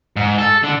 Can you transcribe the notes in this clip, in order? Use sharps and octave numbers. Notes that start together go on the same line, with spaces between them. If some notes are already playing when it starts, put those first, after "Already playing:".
G#2
A4
D3